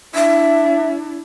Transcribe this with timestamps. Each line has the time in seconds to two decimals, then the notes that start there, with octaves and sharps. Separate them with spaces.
0.15 D4 E4 E5